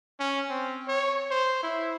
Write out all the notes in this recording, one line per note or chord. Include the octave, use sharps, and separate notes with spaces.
C#4
C4
C#5
C5
E4